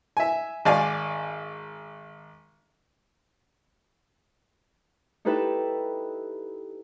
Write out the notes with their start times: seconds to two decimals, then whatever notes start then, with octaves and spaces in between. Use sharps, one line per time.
0.17 E5 G#5
0.65 G#1 D5 F5 G#5
5.25 D#4 E4 G4 A4 B4 E5